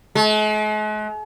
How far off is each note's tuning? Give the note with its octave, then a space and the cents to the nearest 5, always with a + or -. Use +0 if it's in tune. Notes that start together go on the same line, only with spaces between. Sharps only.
G#3 +45